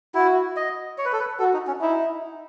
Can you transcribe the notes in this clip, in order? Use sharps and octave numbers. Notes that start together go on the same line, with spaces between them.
E4 F#4
D#5
C#5
B4
A4
B4
F#4 A4
D#4
C#4
D#4 E4